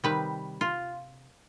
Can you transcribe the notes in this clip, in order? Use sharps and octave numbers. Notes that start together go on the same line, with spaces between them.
C3 D#3 G3 B4
F4